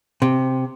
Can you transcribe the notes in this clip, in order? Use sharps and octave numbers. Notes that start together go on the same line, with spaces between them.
C3